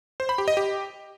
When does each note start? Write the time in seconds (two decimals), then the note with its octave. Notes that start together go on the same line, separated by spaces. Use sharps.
0.20 C5
0.29 B5
0.38 G4
0.48 D#5
0.57 G4